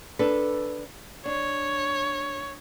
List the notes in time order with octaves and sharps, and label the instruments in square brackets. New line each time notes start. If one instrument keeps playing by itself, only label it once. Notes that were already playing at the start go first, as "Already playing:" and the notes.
[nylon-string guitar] D4 A4 B4
[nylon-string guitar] D4 [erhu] C#5